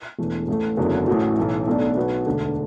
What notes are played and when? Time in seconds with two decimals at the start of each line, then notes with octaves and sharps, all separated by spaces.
0.19 E1 E2 E3 A3
0.48 A1 A2 A3
0.77 F#1 E2 D3 F#3
1.08 A1 A2 A3 F#4
1.37 B1 A2 E3
1.67 B1 B2 A3 D4
1.96 B1 B2 B3 F#4 B4
2.26 E1 D2 D3